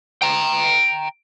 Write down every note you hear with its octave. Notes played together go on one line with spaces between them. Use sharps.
G5 A#5